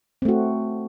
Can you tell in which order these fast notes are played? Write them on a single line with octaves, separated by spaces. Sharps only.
C4 A3 F#4